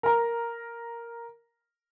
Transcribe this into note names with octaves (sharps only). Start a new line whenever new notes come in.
A#4 A#5